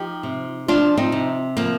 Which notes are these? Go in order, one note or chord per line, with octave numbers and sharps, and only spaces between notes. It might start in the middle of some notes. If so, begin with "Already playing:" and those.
Already playing: F3 D#4 G4
C3
F3 D4 F4
C4 D#4
C3
F3 A#3